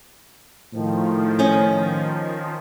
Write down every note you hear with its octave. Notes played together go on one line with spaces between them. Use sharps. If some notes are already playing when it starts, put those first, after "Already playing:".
A2 D#3 F3
C#4 C#5 D#5